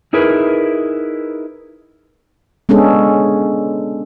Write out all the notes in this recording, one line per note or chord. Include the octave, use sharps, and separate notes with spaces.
D#4 E4 G#4 A#4 B4
G#3 B3 C#4 D4 G#4 A4